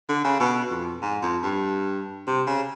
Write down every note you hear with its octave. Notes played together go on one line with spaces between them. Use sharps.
D3
C#3
B2
F2
G#2
F2
G2
C3
C#3